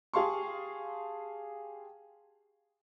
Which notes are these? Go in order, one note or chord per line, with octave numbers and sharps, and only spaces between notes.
G4 G#4 F5 A5 C6 C#6